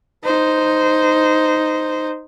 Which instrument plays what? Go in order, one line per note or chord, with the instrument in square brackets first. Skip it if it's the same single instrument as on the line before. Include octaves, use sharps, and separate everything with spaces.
[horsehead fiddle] D#4 C5